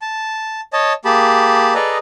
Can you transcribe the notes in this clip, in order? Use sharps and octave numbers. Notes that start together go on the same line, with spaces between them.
A5
C#5 D#5 A5
A#3 G4 G#4 A5 B5
G#4 A4 B4 D5 D#5 A#5